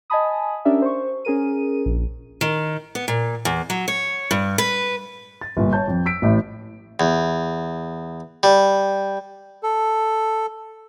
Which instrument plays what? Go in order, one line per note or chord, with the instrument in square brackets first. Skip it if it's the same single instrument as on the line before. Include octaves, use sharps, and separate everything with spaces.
[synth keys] D#5 G#5 A5 B5 D#6
C#4 D4 G4 A#4 D5 E5
C5 C#6
C#4 G#4 A#4 D#7
A#1
[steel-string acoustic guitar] D#3
B3
A#2
E2
F#3
C#5
G2
B4
[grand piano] A6
G1 A#2
C#5 A5 G6
F2
E6 B6 D7
A1 A2
[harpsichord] E2
G3
[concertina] A4